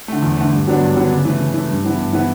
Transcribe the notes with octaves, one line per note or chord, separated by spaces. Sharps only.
D3 A3
E2
D3 A3
G2
D3 F#3 B3 D4
G2
D3 F#3 B3 D4
C#3
E3 A3
C#3
E3 A3
G2
E3 B3 E4
G2
E3 B3 E4